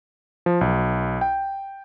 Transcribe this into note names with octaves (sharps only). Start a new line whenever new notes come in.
F3
B1
G5